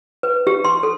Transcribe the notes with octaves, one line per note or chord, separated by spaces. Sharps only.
B4
G4
C6
A4